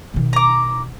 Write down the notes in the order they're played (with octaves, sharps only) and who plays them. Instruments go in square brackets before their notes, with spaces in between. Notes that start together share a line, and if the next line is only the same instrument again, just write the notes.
[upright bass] B2 D#3
[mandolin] A#5 D6